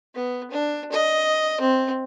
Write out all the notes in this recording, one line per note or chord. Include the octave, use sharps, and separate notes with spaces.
B3
D4
D#5
C4